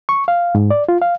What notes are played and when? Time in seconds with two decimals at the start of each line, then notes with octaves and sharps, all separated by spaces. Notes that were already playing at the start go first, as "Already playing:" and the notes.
0.09 C#6
0.28 F5
0.55 G#2
0.70 D5
0.89 F4
1.02 F5